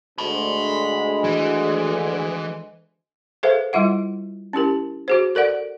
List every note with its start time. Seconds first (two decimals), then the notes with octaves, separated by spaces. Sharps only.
0.18 D2 G#3 A5 B5
1.24 E3
3.43 G#4 A4 B4 C5 E5 F5
3.73 G3 E4 F4 E5 F#5
4.53 C#4 E4 G4 A#4
5.08 F#4 G#4 C5
5.35 A4 A#4 D5 F#5